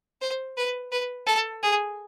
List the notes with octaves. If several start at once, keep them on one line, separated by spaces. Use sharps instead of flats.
C5
B4
B4
A4
G#4